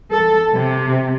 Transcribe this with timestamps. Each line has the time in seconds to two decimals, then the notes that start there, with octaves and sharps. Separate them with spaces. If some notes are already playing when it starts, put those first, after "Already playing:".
0.13 A4
0.54 C3